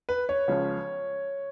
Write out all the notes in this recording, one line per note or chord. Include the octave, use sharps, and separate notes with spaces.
B4
C#5
C#2 C#3 F3